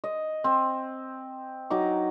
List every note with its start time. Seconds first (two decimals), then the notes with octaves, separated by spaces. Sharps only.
0.04 D#5
0.44 C4
1.70 F#3 D#4 D6